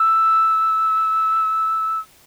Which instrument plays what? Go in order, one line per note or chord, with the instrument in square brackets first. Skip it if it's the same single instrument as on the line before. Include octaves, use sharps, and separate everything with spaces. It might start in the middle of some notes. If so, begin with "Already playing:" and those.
Already playing: [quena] E6